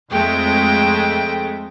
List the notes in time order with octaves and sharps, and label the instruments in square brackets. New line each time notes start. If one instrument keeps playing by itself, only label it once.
[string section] F2 G#3 A3 [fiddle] G5